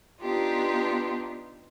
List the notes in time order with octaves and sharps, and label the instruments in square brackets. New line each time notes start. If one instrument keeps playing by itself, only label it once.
[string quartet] B3 D4 D#4 F4 G4